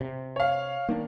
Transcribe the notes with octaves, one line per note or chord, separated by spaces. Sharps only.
C3
C#5 F5
D#3 A#3 D4